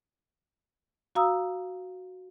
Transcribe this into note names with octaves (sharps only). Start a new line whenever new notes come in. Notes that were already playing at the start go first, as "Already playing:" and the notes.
F#4 F5 A#5 D#6 E6